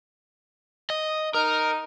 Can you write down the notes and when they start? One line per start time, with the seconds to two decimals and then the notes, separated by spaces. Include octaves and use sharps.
0.90 D#5
1.34 D#4 A#4